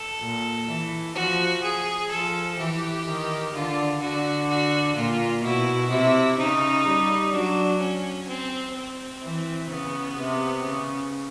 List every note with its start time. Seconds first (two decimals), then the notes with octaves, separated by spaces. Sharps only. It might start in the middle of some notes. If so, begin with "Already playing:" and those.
Already playing: A4
0.21 A#2
0.68 E3
1.16 F3 F#4
1.63 G#4
2.11 F3 A4
2.58 E3 G4
3.06 D#3
3.53 D3 F4
4.01 D3 F#4
4.49 F#4
4.95 A#2 F4
5.43 B2 E4
5.90 C3 E4
6.38 C#3 D#4
6.85 G3
7.33 F#3 D4
7.80 C#4
8.28 C4
8.75 C4
9.23 E3
9.70 C#3 B3
10.18 C3
10.65 C#3